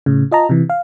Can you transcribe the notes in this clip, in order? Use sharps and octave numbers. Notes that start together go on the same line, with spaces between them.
A2 C#3
F4 D#5 A5 A#5
C3 E3
F5